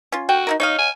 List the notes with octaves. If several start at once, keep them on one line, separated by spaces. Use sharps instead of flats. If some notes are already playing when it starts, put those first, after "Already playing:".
C#4 F4
F#4 G5
D#4 E4 A#4
D#4 C#5 D#5 F5
G#5